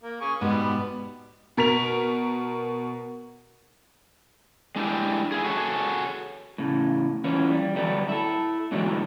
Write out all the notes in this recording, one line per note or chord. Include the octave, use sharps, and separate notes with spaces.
A#3
G#4 C#6
G#2 B2 G3 B3
B2 A#4 B6 F7
G#3 D4 E4 G4
E4 F4 G#4
F#4 G#4 A4 C#5
A2 C#3
E3 B3 C#4 F4
G3
D2 F#3 G3 A3 B3
E4 A4
G#2 B2 D3 E3 F#3 G3